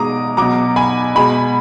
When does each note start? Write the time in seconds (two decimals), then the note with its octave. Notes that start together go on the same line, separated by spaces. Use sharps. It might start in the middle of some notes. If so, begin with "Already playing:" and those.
Already playing: B2 G#3 A#5 D6 D#6
0.37 B2 F#3 A#5 D6
0.76 G#5 B5
1.15 B2 G#3 G#5 B5